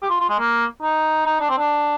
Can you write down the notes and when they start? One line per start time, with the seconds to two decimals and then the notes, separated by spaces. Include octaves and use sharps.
0.02 G4
0.10 F4
0.20 F4
0.29 G#3
0.39 A#3
0.82 D#4
1.26 D#4
1.40 D4
1.50 C4
1.58 D4